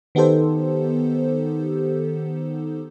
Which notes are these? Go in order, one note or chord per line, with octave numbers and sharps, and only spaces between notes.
D#3 B3 D#4 G4 A4 C5